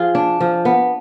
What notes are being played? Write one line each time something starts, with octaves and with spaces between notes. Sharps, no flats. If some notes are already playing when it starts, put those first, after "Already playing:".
Already playing: F3 F4 G#4
D4
F3
B3